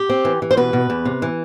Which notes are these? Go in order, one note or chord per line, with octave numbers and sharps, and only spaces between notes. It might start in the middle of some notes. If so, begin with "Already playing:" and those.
Already playing: G4
C4
E3
E3
C5
B2 B4
B2
E2
C3
E3